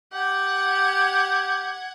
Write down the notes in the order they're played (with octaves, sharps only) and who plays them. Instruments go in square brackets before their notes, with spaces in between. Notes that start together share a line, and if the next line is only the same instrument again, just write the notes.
[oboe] G4 [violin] F#5 G#6